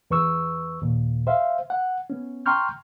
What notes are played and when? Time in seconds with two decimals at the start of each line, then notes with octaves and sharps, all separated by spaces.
0.11 E2 B4 C#6 E6
0.82 D#2 A#2
1.27 C5 E5 F5
1.70 F#5
2.10 B3 C#4
2.46 G5 A#5 C6 C#6 F6 G6